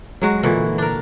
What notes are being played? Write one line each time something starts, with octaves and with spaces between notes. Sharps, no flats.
F#3 G#3 F#4
A#2 D3 E3 F#4
D4 A#4